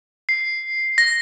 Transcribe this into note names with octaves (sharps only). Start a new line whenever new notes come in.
C7
A#6